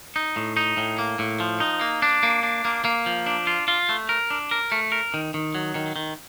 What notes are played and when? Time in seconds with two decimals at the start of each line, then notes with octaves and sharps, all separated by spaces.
0.16 D#4
0.36 A2
0.57 D#4
0.77 A2
0.99 A#3
1.19 A2
1.40 F3
1.60 D#4
1.81 A#3
2.02 D4
2.23 A#3
2.43 D4
2.65 A#3
2.85 A#3
3.06 F3
3.26 D4
3.47 F4
3.68 F4
3.89 A3
4.09 A#4
4.31 D4
4.51 A#4
4.72 A3
4.92 A#4
5.14 D#3
5.34 D#3
5.55 F#3
5.75 D#3
5.96 D#3